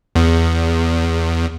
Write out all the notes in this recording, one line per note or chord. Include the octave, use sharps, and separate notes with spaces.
E2